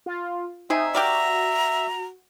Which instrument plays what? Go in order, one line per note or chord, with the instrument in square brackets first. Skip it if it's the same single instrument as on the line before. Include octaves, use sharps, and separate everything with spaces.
[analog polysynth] F4
[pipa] C3 G#4 [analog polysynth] D#4 [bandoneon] E5
[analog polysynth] F#4 [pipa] G4 A#4 D5 [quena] A#5